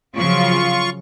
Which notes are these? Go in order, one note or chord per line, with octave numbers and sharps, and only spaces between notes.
C#3 F3 F#3 F4 C#6